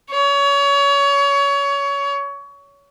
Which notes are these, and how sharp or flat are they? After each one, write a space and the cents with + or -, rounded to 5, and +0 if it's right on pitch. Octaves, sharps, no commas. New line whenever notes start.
C#5 +25